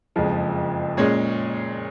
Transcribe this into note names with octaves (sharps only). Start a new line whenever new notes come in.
F#1 F2 F3 G#3
A#2 G#3 C#4 G#4 C#5